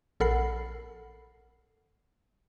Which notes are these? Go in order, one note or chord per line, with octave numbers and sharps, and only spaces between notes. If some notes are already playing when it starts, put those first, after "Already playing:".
A#1 A4 A#4 F#5 B5 C7